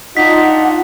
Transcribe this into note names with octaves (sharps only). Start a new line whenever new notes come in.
D4 D#4 F4 F#5 B6